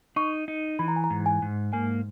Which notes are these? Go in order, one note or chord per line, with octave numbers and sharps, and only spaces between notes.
D#4 C#6
D#4
E3 B5
A#5
G#5
A#5
G#2
G#5
G#2
A#3 G#5